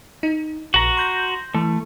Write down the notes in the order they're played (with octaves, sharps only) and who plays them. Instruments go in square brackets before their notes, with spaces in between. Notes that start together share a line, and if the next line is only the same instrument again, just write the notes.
[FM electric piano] D#4
[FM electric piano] A#1 [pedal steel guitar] F#4 A#5
[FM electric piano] C6 G6 A#6
[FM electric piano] E3 [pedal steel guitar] A3